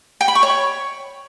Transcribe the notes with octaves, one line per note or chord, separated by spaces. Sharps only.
G5
B5
C#6
C#5